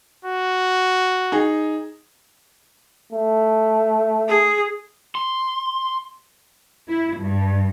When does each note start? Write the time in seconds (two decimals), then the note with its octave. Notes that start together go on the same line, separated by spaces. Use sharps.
0.25 F#4
1.32 D#4 G#4
3.12 A3
4.28 G#4
5.15 C6
6.89 E4
7.20 G2